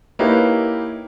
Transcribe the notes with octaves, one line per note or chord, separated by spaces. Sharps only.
A#3 D#4 E4 G4 B4 C#5